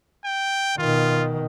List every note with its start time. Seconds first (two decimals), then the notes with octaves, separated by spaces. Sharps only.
0.25 G5
0.78 B2 D#3 F4